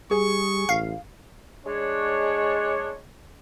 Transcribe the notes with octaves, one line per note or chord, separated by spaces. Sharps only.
G3 G#4 C#6
A1 F5
G#3 D4 C#5